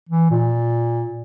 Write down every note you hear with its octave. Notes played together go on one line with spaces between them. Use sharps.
E3
A#2